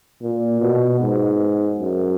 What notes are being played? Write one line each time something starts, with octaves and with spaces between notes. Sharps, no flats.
A#2
B2
G#2
F#2